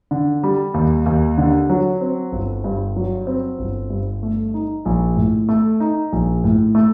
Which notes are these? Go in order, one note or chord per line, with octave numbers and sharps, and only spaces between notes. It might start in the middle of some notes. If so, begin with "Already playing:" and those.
D3
G3
D#2
D#2
D3
F#3
C4
G1
G2
F#3
C4
G1
G2
A3
D#4
A#1
A2
A3
D#4
A#1
A2
A3